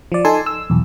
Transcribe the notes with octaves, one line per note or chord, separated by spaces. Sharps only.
F3 D5
D#4 A4 G#5 A5 C6
E6
B1 E2